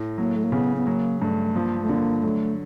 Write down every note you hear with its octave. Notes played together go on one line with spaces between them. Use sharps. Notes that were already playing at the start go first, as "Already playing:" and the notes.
Already playing: A2
F#3 A#3
A3
A#3
C#3 B3
B3
F#3 A#3
G2 A3
F3 A#3
A3
D3 A#3
F#3 A3